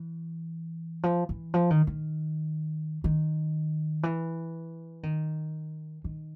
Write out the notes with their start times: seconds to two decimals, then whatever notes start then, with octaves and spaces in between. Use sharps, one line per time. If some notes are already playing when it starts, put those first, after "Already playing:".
Already playing: E3
1.03 F3
1.29 E3
1.54 F3
1.70 D#3
1.87 D#3
3.04 D#3
4.03 E3
5.03 D#3
6.04 D#3